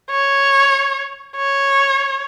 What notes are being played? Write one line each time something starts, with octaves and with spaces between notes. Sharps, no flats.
C#5
C#5